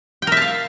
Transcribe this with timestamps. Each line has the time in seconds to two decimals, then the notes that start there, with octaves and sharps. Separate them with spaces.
0.22 G5
0.27 A#4
0.32 E5
0.37 A5
0.42 F5